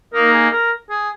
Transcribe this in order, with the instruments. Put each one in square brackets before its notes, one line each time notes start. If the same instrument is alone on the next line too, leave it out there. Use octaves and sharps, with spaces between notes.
[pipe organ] A#3 D#4 [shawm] A#4
[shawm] G#4
A#4
G#4